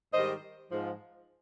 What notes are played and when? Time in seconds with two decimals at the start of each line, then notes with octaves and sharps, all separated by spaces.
0.13 G#2 D#3 G3 C5 D#5
0.71 G#2 F3